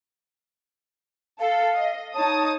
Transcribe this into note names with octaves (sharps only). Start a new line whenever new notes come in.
A4 F5
D#5
D#4 C#5 A5 D#6